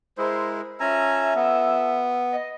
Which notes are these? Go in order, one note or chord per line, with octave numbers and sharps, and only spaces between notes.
G#3 E4 G#4 A#4 C5
C#4 F4 A4 E5 G#5 A#5
B3
D#5